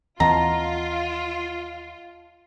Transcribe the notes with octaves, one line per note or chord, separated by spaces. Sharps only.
D#2 E3 C4 F4 D#5 F#5 A5 A#5